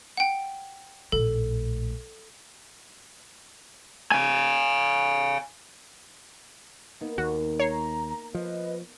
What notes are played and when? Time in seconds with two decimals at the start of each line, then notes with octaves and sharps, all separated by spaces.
0.17 F#5 G5
1.12 A#1 A2 A4
4.12 F5 G#5
7.01 A#3 B3 D#4
7.18 D#2 F#4
7.60 C#5 A#5 C7
8.35 F3 B4 D#5